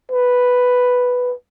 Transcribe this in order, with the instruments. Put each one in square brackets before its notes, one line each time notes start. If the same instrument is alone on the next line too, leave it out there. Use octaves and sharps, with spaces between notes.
[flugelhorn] B4